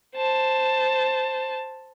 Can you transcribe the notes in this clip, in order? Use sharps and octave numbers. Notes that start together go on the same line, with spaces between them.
C5 A5